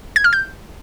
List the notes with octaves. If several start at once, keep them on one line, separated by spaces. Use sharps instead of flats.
G#6
F6
G6